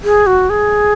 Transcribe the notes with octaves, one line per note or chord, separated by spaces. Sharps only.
G#4
F#4
G#4